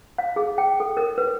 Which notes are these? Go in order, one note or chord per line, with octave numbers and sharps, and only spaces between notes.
F5
G#4
G5
A4
A#4
B4